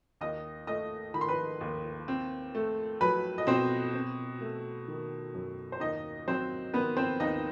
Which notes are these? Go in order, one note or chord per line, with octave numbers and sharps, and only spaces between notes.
D#2 D#5 D#6
A3 D#5 D#6
D#3 B5
C6
B4 B5
D#2
C4
A3
F#3 B4 B5
D#5
B2 C4 C5
C4
A3
D#3
F#2
C5
D#2 D#4 D#5
F#3 C4 C5
D#3 B3 B4
C4 C5
D#2 D#4 D#5